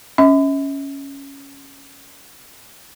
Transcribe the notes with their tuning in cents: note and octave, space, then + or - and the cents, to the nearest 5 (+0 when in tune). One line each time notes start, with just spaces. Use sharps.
C#4 +0 E5 -40